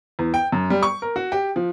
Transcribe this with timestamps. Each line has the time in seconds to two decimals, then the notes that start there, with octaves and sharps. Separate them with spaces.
0.19 E2
0.34 G5
0.52 F#2
0.70 G3
0.83 C#6
1.02 A#4
1.16 F#4
1.32 G4
1.56 F3